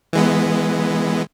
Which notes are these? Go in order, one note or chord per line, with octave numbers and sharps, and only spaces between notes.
E3 G#3 B3